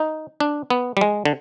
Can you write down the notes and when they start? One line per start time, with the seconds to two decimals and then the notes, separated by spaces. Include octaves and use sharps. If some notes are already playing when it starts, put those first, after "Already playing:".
Already playing: D#4
0.40 D4
0.70 B3
0.97 G3
1.01 G#3
1.25 D3